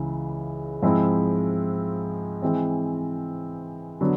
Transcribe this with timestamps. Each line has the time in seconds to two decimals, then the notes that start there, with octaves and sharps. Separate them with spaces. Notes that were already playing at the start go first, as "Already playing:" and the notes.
Already playing: C#2 C#3 E3
0.82 G#2 F3 G#3 C4 E4
2.42 E3 G#3 C4
4.01 D3 F#3 B3